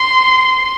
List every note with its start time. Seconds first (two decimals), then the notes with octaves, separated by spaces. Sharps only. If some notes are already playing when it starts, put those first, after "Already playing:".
Already playing: C6